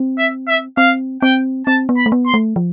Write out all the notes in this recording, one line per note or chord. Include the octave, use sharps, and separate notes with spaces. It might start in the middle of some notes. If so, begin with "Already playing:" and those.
Already playing: C4
E5
E5
C4 F5
C4 G5
C4 A5
B3
B5
A3
B3
C6
A3
F3